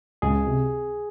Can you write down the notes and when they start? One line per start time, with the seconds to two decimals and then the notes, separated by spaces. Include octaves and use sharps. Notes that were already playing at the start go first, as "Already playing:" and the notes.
0.22 C#2 G#4
0.47 C3